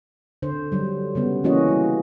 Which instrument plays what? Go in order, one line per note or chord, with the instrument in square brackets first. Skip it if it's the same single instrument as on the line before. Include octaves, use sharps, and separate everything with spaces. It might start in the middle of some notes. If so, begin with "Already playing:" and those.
[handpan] D3 C5
D3 F#3 G3
C#3 G3 B3
E3 A#3 C#4 F#4 D#5
G3